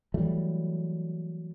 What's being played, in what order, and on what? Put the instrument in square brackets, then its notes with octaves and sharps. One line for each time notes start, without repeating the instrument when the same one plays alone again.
[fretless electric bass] E3 F#3 G3 A3